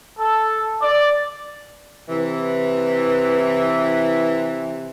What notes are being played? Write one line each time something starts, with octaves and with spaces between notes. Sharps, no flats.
A4
D5
C3 E3